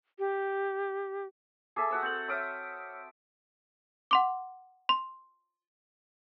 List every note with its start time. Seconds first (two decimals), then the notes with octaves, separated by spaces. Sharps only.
0.19 G4
1.76 G#4 A4 E5 A5 D6
1.91 F#4 F#5 E6
2.02 C4 A4 G6 F#7
2.28 C#5 E5 D6 D#6 F6 G6
4.11 F#5 C6 D6
4.89 C6